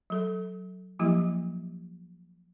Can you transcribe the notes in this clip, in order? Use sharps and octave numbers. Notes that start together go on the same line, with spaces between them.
F#3 A4
F3 F#3 A#3 E4 G4